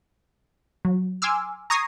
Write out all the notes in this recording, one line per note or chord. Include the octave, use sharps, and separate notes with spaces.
F#3
G#5 C6 D6 E6 F6
A#5 C#6 D#6 G#6 A#6 C7